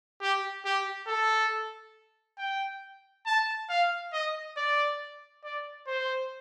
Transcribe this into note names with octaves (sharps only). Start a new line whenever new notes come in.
G4
G4
A4
G5
A5
F5
D#5
D5
D5
C5